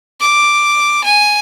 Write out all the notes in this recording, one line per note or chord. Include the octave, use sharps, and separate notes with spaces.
D6
G#5